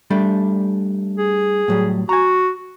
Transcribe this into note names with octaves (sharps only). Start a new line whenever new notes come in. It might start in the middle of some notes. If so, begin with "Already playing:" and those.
G3 A3 D4
G#4
A2 F#3 G3
F#4 G#5 A#5